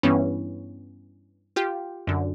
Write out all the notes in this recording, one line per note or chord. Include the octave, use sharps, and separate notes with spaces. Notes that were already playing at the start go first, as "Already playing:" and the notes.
G2 E3 B3 C#4
F4 G4
F#2 D3